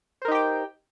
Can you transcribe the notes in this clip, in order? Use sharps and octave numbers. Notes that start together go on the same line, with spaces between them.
D#4 G4 A#4 C5 G5